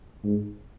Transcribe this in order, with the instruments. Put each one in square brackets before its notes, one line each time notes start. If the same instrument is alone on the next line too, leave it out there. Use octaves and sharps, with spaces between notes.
[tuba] G#2